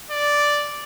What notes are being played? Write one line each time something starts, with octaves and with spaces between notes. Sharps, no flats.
D5